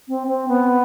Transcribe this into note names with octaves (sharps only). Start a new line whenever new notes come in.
C4
C4
B3